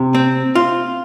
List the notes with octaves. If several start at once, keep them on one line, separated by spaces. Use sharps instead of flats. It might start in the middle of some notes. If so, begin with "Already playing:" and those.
Already playing: C3
C4
F4